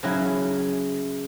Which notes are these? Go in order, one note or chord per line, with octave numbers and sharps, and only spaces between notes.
C#3 F#3 C#4 E4